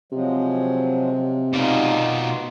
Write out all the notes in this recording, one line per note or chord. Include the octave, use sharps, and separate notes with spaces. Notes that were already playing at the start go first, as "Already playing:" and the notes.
C3 F3 F#3 G#3
B2 D#4 F4 D5